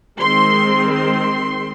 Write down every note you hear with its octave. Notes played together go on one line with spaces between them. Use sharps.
D#3 G#3 C4 C6
C6